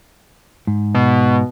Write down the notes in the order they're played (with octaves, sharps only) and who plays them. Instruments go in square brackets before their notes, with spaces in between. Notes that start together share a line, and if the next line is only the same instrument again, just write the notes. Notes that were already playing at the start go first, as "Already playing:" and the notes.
[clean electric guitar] G#2
[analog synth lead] B2